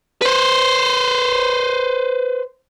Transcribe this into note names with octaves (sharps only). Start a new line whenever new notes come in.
B4 C5